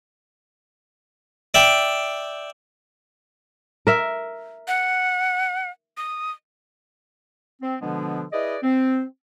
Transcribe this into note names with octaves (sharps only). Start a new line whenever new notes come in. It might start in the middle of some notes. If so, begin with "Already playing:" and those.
D5 E5 G5
A#4 E5
F#5
D#6
C4
B2 D3 F3 G#3 B3 D4
E4 G#4 B4 D5 D#5
C4